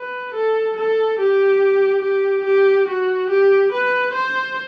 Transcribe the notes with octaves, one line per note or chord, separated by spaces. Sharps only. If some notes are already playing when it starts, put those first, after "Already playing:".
Already playing: B4
A4
A4
G4
G4
G4
F#4
G4
B4
C5